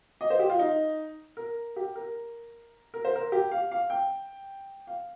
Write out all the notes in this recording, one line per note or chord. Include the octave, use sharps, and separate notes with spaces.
D#5
C5
G4
F4
D#4
A#4
G4
A#4
A#4
C5
A#4
G4
F5
F5
G5
F5